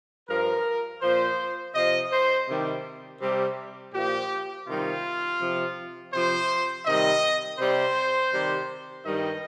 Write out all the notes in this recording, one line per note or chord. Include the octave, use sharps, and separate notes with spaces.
G2 F3 A#4
A#2 F3 C5
C3 F3 D#5
C5
C3 D#3 G3
C3 G3
A#2 F3 G4
C3 D#3 G3 F4
C3 F3
C3 F3 C5
C3 D#3 G3 D#5
C3 G3 C5
C3 D#3 G3
G2 D#3 G3 D#5